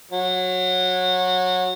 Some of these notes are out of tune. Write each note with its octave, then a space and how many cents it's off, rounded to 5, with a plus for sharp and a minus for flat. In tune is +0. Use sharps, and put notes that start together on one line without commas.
F#3 -15